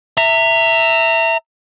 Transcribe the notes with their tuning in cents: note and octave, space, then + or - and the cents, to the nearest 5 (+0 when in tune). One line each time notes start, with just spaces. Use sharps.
E5 +0 A#5 -25